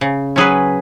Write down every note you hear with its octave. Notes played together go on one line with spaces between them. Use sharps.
C#3
F#3 C#4 G#4 B4